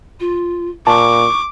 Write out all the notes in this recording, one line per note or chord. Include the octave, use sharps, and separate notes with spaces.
F4
A#2 A5 C#6 D6